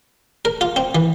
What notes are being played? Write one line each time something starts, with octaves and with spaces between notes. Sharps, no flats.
A#4
F4
C4
E3